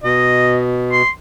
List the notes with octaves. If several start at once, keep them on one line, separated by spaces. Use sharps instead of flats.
B2 D#5
C6